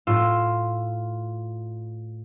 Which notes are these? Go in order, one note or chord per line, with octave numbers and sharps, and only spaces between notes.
A2 F4 C6 E6